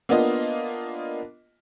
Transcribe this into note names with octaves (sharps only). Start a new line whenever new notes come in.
A#3 B3 D4 F4 D#5